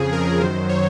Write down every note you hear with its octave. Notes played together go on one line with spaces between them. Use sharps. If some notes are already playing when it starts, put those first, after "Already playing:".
Already playing: F2 C#3 F3 G#4
A#4
F#2 D#3 F#3 C5
C#5